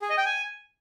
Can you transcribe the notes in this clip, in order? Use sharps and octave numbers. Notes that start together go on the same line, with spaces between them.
G#4
D#5
G5
G#5